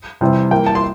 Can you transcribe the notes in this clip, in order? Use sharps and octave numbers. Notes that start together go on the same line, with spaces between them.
C3 E3 G3 C4
E3 G3 A#3 G5
A5
C6